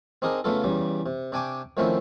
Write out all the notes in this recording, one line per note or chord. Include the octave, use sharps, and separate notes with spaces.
C4 D4 D#4 G#4 A#4
C#3 A3 B3 F4 A4
E2 C#3 G3
C3
C3 D4 G5 G#5 C#6 D6
D#3 F3 A3 C4 C#4 E4